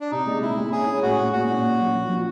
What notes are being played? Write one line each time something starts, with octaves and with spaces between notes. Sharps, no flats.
D4
C3 D#4
G#3
G#3 E4
G#3
C#4 G#4
C#4
A2 F#4
C#4
A#2 F#4
A#2
A#2
F#3
F3
F3